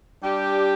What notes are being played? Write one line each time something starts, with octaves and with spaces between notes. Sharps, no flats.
G3 D4 G4